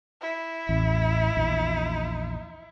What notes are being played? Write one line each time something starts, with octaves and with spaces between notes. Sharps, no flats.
E4
A1 E2
A#1 E2